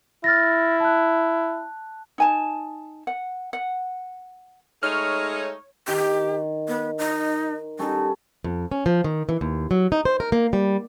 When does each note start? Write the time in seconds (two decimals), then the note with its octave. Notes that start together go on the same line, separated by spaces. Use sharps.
0.24 E4 F6 A6 A#6
0.80 A5 F#6
2.18 D#4 G#5 A5
3.07 F#5
3.53 F#5
4.83 G#3 A3 D#4 C#5 F6
5.88 D#3 G4
6.68 B3
6.98 D#4
7.79 G3 C#4 D#4 A4
8.44 F2
8.72 C#4
8.86 F3
9.04 D#3
9.29 E3
9.41 D#2
9.71 F#3
9.92 D#4
10.05 C5
10.20 A#4
10.32 A#3
10.53 G3